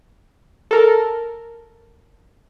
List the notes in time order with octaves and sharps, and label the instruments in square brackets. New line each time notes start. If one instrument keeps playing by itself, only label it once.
[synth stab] A4 A#4